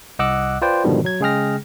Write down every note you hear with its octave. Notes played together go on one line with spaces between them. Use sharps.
C2 D#5 F#5 D6 E6 F#6
F4 B4 C5 D5 G5
G#2 B2 D3 D#3 F3 G3
F#3 G#6
C#3 G#3 G#4 G5 F6 A#6